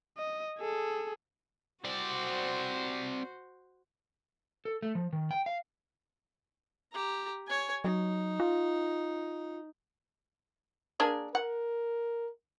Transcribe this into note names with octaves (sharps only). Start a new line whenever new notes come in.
D#5
G#4 A4
C4 F#4 C5 D5
A4
A3
F3
D#3
G5
F5
G4 A#5
C#5 G#5
F#3 D#4
F4
A#3 D4 G#4
A#4 F#5